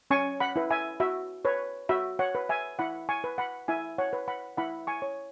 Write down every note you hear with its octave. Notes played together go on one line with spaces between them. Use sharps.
C#4 G#5 C#6
F#5 B5
E4 B4
E5 G#5
F#4 E5
B4 C#5
F#4 E5
C#5 F#5
B4
E5 G#5
E4 F#5 B5
G#5 C#6
B4
F#5 B5
E4 E5 G#5
C#5 F#5
B4
F#5 B5
E4 F#5 B5
G#5 C#6
C#5